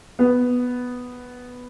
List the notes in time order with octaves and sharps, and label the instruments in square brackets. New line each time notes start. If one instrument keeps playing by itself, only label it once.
[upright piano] B3